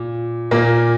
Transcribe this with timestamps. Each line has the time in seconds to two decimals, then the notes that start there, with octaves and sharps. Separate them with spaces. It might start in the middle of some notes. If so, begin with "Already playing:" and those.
Already playing: A#2
0.51 A#2 A#3